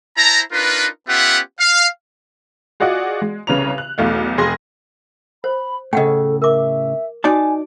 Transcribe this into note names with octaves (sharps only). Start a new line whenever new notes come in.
E4 C5 A5 A#5
D4 D#4 F4 A#4 B4
B3 C#4 F4 G4 E5 F#5
F5
F4 F#4 G#4 D5 D#5 F#5
G#3
C2 C#3 B4 C#5 A#5 F7
F#6
B1 E2 A3 F5
F1 G#4 C6 A#6
C5 B5
A2 C#3 A4 D#5 F#5 G5
A#4 E5 D6
D#4 F#4 D5 G#5 A5